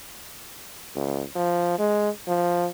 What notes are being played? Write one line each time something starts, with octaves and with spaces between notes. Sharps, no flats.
C#2
F3
G#3
F3